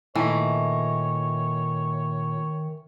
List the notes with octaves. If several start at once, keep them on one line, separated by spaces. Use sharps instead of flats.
A#2 D#3 E3 A3 D#4 C#5